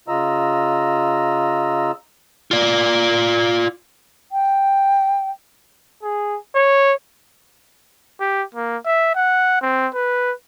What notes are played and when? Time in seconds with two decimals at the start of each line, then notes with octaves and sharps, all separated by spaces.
0.08 C#3 F4 D#5 A#5 E6
2.51 F4 D5
4.32 G5
6.03 G#4
6.55 C#5
8.20 G4
8.55 A#3
8.85 E5
9.16 F#5
9.62 C4
9.94 B4